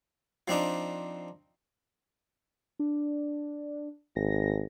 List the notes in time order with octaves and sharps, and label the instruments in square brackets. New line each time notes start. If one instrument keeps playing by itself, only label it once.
[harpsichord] F3 C4 D4 D#4
[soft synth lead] D4
[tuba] G#1 [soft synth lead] A#6